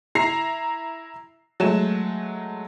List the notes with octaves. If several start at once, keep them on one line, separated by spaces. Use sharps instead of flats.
E4 A#5 C7
F#3 G#3 A3 E7